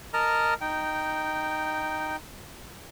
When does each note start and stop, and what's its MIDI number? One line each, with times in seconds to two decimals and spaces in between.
0.14 0.54 70
0.14 0.54 75
0.14 0.54 81
0.14 0.54 82
0.14 0.54 89
0.61 2.16 63
0.61 2.16 79